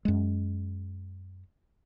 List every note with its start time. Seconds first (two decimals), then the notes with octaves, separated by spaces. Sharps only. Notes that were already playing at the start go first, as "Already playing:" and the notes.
0.05 F#2 G#3